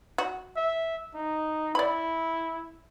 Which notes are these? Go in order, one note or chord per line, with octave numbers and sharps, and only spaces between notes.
F#4
E5
D#4
E4 D5 B5